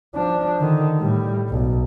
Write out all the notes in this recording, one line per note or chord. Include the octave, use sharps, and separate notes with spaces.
F3 D4
D3 D#3
A2 G3
B1